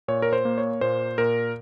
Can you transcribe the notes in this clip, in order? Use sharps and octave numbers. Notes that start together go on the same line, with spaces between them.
A#2 C#5
A#4
C5
A#3
C#5
A#2 C5
A#2 A#4